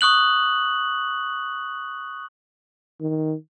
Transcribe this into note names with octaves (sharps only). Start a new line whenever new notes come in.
C#6 D#6 F#6 F#7
D#3